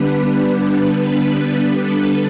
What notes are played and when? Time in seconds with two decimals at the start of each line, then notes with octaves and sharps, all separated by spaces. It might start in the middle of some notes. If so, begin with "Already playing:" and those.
Already playing: D3 G3 B3 D4 B4
0.15 B4
1.78 A4